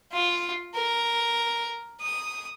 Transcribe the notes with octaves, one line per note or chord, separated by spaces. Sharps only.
F4
A#4
D#6